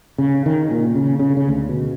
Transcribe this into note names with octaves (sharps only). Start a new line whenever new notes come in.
C#3
D#3
A#2
C#3
C#3
C#3
D2
B2